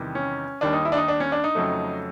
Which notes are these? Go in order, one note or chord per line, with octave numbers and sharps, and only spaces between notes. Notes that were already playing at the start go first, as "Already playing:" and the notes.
Already playing: E2 C3 D#3 G3
C#4
D#2 D#3 G3 D4
D#4
E4
D4
D#4
D4
C#4
D4
D#4
F2 C#3 F#3 A3